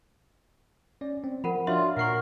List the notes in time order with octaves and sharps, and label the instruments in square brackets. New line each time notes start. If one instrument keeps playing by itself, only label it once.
[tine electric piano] C#4 D5
C4
[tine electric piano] F3 [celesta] A#4 F#5 B5
[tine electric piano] D4 F#4 D5 [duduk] F4 [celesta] C#5 E5 C6
[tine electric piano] A#2 C7 [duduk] A#4 [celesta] F#5 C#6